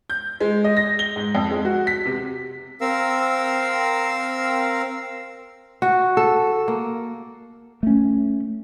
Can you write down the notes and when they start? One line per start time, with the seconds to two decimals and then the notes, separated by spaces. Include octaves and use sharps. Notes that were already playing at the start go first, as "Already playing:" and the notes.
0.10 G6
0.40 G#3
0.64 D#5
0.77 A#6
0.99 G7
1.16 G#2
1.35 F2
1.51 G#3
1.65 F#4
1.87 B6
2.05 C3
2.81 C4 A#4 F5 E6
5.82 F#4
6.17 A4
6.68 A#3
7.83 A3 C#4